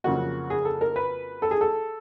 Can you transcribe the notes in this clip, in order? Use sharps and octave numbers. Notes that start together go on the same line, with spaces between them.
F2 C#3 F#3 A#3 F#4
G#4
A4
A#4
B4
A4
G#4
A4